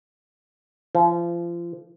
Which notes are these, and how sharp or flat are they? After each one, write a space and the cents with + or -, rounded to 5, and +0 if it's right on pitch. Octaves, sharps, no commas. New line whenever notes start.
F3 -30